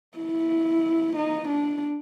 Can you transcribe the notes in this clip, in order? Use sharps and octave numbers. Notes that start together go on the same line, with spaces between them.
E4
D#4
D4